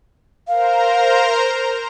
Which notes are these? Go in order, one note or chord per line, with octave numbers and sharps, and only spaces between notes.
A#4 C5 F5 A#5